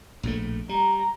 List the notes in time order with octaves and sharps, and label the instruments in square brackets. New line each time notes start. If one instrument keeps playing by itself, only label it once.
[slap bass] A#1 A2 A3
[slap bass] G3 [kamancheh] A#5